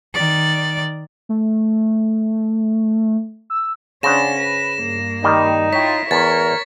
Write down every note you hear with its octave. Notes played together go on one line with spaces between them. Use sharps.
D#3 D5
A3
E6
C#3 C#4 D4 C5 F#5 A#6 E7
B4
G2 A#3
D#3 G3 D#4
E4 F4 C#5 G5 B6
E2 A#4 C#5 A6 B6